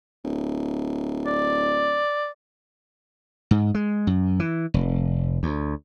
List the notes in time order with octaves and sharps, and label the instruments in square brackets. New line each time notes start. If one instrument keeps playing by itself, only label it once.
[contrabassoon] D1
[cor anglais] D5
[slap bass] G#2
G#3
F#2
E3
F1
D2